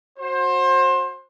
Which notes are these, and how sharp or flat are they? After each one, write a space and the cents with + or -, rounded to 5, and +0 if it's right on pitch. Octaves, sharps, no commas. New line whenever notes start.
F#4 -20 C5 +25